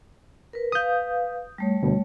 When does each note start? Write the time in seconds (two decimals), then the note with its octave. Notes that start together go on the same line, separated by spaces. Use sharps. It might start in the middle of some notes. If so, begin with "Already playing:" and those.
0.53 A#4 B4
0.72 B4 F5 D#6 G6
1.58 G3 A3 C#5
1.82 D2 B2